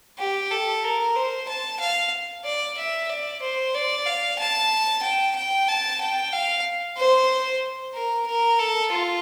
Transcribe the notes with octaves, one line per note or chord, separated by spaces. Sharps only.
G4
A4
A#4
C5
A5
F5
D5
E5
D5
C5
D5
F5
A5
G5
G5
A5
G5
F5
C5
A#4
A#4
A4
F4